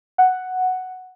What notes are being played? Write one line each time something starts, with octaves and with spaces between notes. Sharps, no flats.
F#5